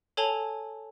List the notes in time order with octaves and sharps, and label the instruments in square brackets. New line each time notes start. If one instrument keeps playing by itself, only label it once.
[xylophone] A4 C#5 G#5 A5 F7 G7